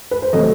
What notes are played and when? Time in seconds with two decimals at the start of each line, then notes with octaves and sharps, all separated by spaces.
0.11 B4
0.22 C5
0.33 C3 F#3 A3 D#5